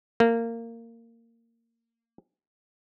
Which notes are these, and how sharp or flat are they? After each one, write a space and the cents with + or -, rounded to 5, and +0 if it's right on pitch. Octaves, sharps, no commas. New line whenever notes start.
A#3 -20